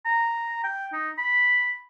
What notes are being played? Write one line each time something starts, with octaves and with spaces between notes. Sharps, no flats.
A#5
G5
D#4
B5